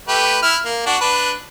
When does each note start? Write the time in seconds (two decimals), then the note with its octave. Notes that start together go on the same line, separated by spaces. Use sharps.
0.08 A3 G4 B4
0.43 E4 F6
0.65 A#3
0.86 D4 F#4
1.01 D4 B4